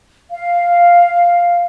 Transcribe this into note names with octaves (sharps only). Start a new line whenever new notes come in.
F5